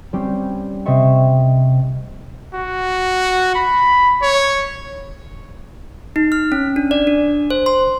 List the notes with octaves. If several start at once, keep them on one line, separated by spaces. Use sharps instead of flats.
G3 C4 C#4 G4
C3 C4 D#5 E5 C#6
F#4
B5
C#5
D#4
F6
C#4
D4
D5
D4
C5
C6